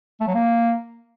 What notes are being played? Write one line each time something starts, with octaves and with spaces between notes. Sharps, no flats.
A3
F#3
A#3